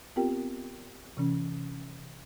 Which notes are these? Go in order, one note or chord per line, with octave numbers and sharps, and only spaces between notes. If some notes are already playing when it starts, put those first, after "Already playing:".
B3 C4 F4 G4 A#4 G5
C3 E3 C#4